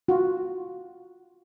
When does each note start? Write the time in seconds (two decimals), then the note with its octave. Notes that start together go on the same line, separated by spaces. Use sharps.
0.08 F4 F#4